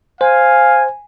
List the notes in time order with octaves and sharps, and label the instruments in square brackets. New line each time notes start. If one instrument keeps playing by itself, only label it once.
[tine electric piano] C5 [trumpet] F5 [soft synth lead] G#5